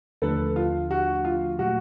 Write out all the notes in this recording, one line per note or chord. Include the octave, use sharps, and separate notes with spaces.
D#2 D3 F3 A3 D4 A4 B4
F4
F#4
F4
A#2 F#3 A3 F#4